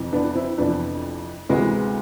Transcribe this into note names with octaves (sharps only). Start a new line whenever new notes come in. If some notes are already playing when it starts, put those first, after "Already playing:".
Already playing: F2 C3 E3
B3 D4
C4 E4
F2 C3 E3 B3 D4
D2 C3 E3 G#3 B3